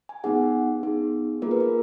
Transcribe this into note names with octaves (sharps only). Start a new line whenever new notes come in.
G#5
B3 D#4 G#4 F#5
B3 D#4 G#4
A#3 F4 G#4 A#4
B4
A#4